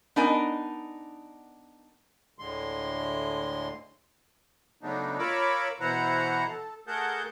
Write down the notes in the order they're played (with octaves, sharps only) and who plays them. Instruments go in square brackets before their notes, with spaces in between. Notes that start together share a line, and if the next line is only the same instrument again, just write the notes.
[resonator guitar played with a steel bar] B3 D4 D#4 A#4 D#5 G#5
[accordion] D2 A2 D3 G#3 C6
C#3 F#3 A3 B3 D4 D#4
F4 A#4 C#5 B5 D6 E6
B2 E3 E4 C5 F#5 A#5
A4
A3 G#4 A#4 F#5 A5 G6